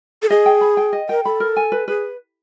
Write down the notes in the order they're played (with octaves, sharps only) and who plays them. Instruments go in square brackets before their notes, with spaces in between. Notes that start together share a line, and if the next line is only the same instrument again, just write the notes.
[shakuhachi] A4
[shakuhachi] G#4 [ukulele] D#5
[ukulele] G5
B5
G5
D#5
[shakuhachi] A#4 [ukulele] G5
[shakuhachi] A4 [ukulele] B5
[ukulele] A#4
G#5
B4
[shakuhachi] G#4 [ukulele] B4